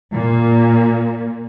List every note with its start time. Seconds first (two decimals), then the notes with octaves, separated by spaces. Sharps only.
0.15 A#2